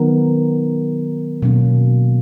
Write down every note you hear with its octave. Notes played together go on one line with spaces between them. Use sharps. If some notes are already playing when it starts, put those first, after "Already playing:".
Already playing: D#3 F#3 B3 D#4 A#4
B2 F#3 A#3 C#4